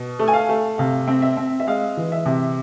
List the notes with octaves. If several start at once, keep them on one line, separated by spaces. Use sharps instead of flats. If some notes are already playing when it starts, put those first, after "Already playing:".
Already playing: B2
A3
G#5
F5
A3
C3 F5
C4
E5
C4
E5
G#3 F5
E3
E5
C3